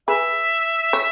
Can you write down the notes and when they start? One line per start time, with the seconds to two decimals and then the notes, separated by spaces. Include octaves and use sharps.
0.07 G#4 B4 E5
0.93 C#5